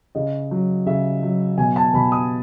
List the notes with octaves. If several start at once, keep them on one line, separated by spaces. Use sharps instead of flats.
C#3 D#5
F#3
C#3 E5
F#3
B2 G#5
A5
B2 B5
D#6